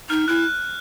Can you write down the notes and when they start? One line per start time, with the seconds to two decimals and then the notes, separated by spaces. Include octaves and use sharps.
0.10 D#4 F6
0.28 E4 F#6